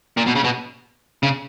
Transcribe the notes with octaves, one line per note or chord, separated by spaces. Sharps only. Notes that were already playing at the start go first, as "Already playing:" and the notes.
A#2
B2
C#3
B2
C#3